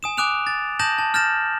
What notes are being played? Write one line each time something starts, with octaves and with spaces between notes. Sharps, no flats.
G#5 D#6 E7
G#5 D6 D#6 F#6 D7 F7
A6
A5 D#6 G6 A#6 E7 F#7
A5
F6 G6 A6 A#6 E7